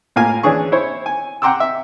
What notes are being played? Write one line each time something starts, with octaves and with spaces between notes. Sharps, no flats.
A2 A#3 F4 F5 G#5
E3 C#4 D4 G#4 C#6
E4 C5 C#5
G#5
F#5 G5 A#5 C6 D6 E6
E5